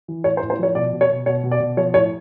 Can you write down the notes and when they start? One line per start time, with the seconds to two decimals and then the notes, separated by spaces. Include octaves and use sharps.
0.08 E3
0.24 A2 C#5
0.37 C5
0.42 A2
0.50 C5
0.59 F3 C#5
0.75 B2 D5
0.93 B2
1.01 C#5
1.09 B2
1.26 B2 C#5
1.43 B2
1.52 D5
1.60 B2
1.77 F3 C#5
1.94 A2 C#5